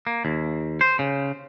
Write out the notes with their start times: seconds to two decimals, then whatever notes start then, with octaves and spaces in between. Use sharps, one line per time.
0.07 A#3
0.25 D#2
0.81 C5
0.99 C#3